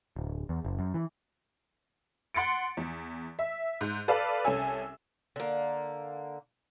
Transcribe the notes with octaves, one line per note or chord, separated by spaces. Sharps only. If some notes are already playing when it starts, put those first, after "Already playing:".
D1
E2
F#1
F#2
E3
F#5 C6 A6 C#7 D7
E2
E5
G#2
A4 B4 D5 F5 A5
C2 C#4 A4 G#5 E6
D3 A#3